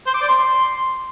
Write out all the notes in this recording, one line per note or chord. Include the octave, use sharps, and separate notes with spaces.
C5
D6
D5
C6